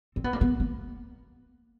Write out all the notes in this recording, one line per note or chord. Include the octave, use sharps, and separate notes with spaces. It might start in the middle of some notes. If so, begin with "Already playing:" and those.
C4
B3
A#3
B3
A#3